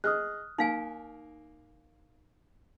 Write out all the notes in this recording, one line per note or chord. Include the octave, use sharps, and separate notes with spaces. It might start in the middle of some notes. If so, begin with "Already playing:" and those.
G#4 D#5 D#6 F6 F#6
A#3 D#4 F5 G#5